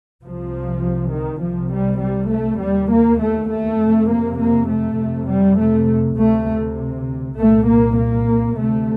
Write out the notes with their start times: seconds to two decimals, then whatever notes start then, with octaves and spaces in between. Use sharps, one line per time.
0.22 C2 C3 F3
1.11 D#3
1.41 C2 C3 F3
1.71 G3
2.00 G3
2.31 A3
2.60 D#2 G3
2.90 A#3
3.21 A3
3.51 A3
3.80 F2 C3
4.10 A#3
4.40 A#3
4.69 A3
4.99 F2 C3
5.29 G3
5.59 A3
6.19 D2 C3 A3
7.38 C2 A#2 A3
7.68 A#3
7.98 A#3
8.58 D2 C3 A3